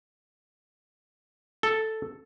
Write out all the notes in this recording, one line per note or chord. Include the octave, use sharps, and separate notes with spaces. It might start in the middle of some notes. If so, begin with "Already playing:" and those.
A4